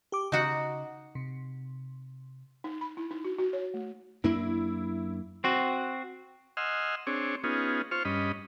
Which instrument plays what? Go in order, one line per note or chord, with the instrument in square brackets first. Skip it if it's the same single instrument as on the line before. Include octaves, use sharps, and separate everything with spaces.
[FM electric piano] G4 D6
[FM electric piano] C#3 [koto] D#4 F#4 F#5
[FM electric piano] C3
[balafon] D#4
B5
E4
D#4
F#4
F#4
C#5
A3
[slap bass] F#2 A#3 D4 [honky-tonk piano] E4
[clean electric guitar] C4 F#4
[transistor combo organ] D#5 F#5 G#5 C6 E6 F6
C4 D4 G#4 C#5
B3 C#4 D#4 F4 G#4
F4 C5 C#6 F6
G2 C#4 D#5 B5